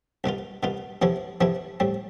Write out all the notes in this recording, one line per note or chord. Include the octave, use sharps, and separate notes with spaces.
C2 B2 B3 F4
C2 B2 B3 F4
F2 C3 F3 B3 E4
F2 C3 F3 B3 E4
A2 G3 C4